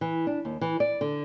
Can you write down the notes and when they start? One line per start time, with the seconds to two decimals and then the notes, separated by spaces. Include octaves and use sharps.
0.01 E3
0.27 D4
0.45 D#2
0.61 E3
0.80 D5
1.01 D3